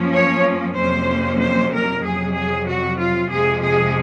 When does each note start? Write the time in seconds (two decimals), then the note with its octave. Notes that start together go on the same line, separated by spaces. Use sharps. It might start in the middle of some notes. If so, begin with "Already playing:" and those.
Already playing: F#2 F3 A#3 C#4
0.14 C#5
0.76 F2 C3 F#3 A#3 C#4 C5
1.40 C5
1.72 A#4
2.04 F2 C3 F#3 G#4
2.35 G#4
2.68 F#4
2.99 F4
3.30 F2 C3 F3 G#3 G#4
3.62 G#4